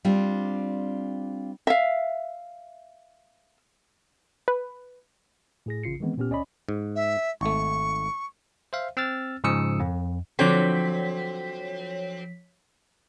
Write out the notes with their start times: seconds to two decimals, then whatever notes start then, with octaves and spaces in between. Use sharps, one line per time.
0.05 G3 C4 D4 F4
1.67 E5 F5
4.48 B4
5.66 A2 G#4 A#6
5.83 A1 C#3 F4 C7 C#7
6.00 D#3 E3 G#3 B3 C4
6.18 A#2 B3 C#4 G4 F6
6.30 C#2 C#4 D5 D#5 B5
6.69 G#2
6.96 E5
7.41 G#1 A3 C#6
8.73 C5 E5 F5
8.97 C4 E6 F6 A6
9.44 G#2 C#3 F3 D#6 E6 C#7
9.80 F2
10.39 D3 F3 F#3 C4 C#5 B6